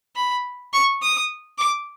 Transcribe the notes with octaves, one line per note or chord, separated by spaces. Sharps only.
B5
C#6
D#6
D6